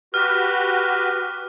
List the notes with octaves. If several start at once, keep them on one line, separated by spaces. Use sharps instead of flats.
F#4 G4 B4 F6